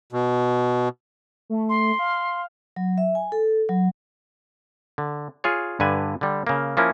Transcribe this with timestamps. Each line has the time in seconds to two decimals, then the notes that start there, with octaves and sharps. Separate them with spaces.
0.13 B2
1.50 A3
1.69 C6
1.99 F5
2.76 F#3
2.98 E5
3.15 G#5
3.32 A4
3.69 F#3
4.98 D3
5.44 F4 G#4 C#5
5.80 G2 D3 B4 G#5
6.21 D3 G3
6.47 C#3 A#3
6.77 F3 A#3 C#4 E4